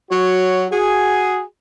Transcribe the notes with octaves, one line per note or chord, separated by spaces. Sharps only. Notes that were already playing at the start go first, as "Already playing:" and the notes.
F#3 F#4 C#5
F#4 G#4